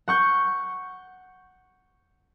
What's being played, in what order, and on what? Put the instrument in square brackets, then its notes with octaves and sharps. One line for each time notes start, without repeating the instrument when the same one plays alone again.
[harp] F#5 C#6 G6